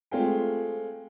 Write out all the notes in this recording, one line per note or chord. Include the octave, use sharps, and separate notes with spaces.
G#3 A3 C4 F4 G#4 G5